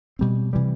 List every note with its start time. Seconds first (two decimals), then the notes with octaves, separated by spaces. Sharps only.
0.19 B2 G3 C4
0.53 C3 E3 G3